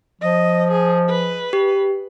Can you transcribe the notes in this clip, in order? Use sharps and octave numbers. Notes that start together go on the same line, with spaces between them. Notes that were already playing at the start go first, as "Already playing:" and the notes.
F3 D#5
G#4
B4
G4